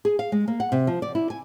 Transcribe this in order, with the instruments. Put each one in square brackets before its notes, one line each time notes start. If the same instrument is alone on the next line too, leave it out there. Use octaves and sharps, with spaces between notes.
[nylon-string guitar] G#4
F5
G#3
A#3
F#5
C3
F3
D5
E4
G#5